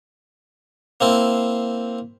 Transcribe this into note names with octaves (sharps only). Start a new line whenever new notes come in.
A#3 C4 E4